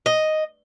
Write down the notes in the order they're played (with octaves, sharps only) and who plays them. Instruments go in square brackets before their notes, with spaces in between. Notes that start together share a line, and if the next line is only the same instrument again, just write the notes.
[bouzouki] D#5